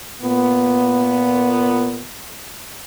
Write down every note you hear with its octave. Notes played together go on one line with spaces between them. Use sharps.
A#2 B3